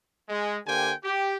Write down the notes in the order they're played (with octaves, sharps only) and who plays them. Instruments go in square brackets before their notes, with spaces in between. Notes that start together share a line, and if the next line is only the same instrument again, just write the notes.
[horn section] G#3
D3 A#3 G4 C5 G5 G#5
G4